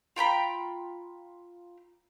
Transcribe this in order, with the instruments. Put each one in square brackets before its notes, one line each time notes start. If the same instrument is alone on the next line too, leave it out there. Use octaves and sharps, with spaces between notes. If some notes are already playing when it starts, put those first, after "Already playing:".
[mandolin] F4 G5 A#5 B5